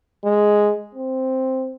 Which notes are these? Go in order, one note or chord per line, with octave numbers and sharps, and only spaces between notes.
G#3
C4